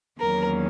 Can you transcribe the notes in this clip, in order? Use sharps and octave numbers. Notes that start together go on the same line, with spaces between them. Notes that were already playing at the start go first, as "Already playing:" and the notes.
E2 D#3 F#3 A#3 C#4 A#4